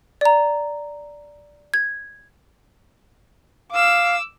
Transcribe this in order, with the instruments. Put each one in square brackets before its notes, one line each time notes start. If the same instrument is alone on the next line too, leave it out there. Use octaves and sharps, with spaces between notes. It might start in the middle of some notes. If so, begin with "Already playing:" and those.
[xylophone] D5 A#5
G#6
[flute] F5 [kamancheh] D6 E6